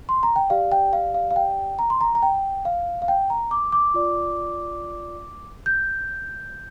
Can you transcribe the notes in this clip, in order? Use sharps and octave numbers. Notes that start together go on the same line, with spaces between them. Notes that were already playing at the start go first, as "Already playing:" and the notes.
C6
A#5
G5
G4 D5 F5
G5
F5
F5
F5
G5
A#5
C6
A#5
A#5
G5
F5
F5
G5
A#5
D6
D6
F4 D5
G6